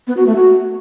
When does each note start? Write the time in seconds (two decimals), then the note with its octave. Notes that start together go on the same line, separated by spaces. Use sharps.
0.07 B3
0.17 F#4
0.26 A3
0.36 F#4